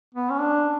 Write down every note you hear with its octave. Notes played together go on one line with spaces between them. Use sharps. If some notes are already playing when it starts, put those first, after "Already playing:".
B3
C#4
D4